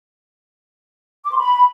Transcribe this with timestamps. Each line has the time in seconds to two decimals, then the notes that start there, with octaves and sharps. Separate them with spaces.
1.25 D6
1.32 C6
1.38 B5